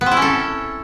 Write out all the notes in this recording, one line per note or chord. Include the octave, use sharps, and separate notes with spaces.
B3
C4
E4
C#4
A4